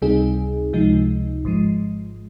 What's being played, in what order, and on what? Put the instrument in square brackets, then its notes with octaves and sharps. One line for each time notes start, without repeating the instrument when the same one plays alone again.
[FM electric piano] C#2 C3 G3 C4 D#4 G#4
C#2 C3 F3 G#3 D#4
G#1 G#2 F3 G#3